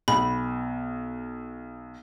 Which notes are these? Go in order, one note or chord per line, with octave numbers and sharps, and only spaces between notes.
B1 B5